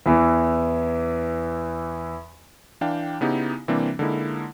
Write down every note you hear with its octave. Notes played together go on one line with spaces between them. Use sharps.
E2 E3
E3 D4 F5 G5
C#3 B3 D#4 E4 G4
C3 E3 G3 A#3 C4 D4
D3 G#3 A#3 D#4 E4